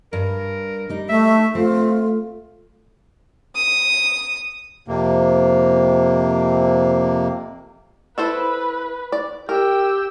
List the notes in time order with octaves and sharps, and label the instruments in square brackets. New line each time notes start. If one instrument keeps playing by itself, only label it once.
[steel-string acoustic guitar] G2 [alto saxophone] A#4
[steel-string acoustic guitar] G3 D#4
[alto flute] A3 [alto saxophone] E5
[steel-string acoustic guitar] A3 [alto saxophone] C4 [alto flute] F4
[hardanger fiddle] D#6
[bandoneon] F2 C3 A#3
[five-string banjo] E4 A4 C5 [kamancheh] B4
[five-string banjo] D5
[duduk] G4 [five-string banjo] A#4 [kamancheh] G5 E6